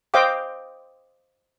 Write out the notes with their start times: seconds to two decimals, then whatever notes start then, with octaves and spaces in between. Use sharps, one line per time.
0.14 C5 D#5 F5 G5 D6